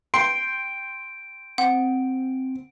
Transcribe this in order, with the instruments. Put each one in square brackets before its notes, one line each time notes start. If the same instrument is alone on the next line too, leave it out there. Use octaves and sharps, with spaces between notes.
[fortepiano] G5 C6 [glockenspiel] D7
[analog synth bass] C4 [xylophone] F#5